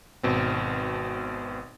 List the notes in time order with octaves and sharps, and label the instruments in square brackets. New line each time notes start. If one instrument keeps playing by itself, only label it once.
[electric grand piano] G#1 B2 C4